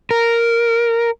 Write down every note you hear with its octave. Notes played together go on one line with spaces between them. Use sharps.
A#4